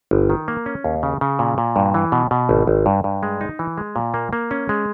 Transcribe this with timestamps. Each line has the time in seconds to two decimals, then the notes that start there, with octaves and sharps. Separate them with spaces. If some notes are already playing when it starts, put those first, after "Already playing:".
0.11 G1
0.30 D#3
0.48 A#3
0.66 C#4
0.84 D#2
1.03 C#3
1.21 C#3
1.39 A#2
1.58 A#2
1.76 G2
1.94 E3
2.12 B2
2.31 B2
2.49 G#1
2.67 G#1
2.86 G2
3.04 G2
3.23 G#3
3.41 D#4
3.59 E3
3.78 G#3
3.96 A#2
4.14 A#3
4.33 A#3
4.51 C#4
4.69 G#3